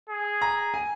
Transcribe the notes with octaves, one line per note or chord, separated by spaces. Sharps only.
G#4
A#5
G#5